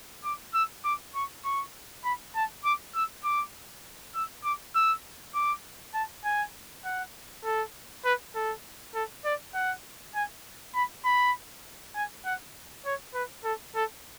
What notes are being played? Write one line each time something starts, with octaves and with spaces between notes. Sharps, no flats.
D6
E6
D6
C#6
C#6
B5
A5
D6
E6
D6
E6
D6
E6
D6
A5
G#5
F#5
A4
B4
A4
A4
D5
F#5
G#5
B5
B5
G#5
F#5
C#5
B4
A4
A4